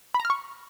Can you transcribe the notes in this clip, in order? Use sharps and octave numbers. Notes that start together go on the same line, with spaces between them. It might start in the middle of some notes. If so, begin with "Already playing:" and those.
B5
A#5
F6
C#6